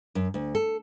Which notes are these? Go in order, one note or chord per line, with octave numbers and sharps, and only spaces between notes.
F#2
D2
A4